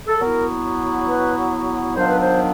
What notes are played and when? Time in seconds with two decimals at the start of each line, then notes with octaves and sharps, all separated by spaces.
0.07 A4
0.19 F#3 B3 E4 A#4
1.07 B4
1.95 D#3 F#3 B3 D4 F4 C5
2.07 B4
2.20 C5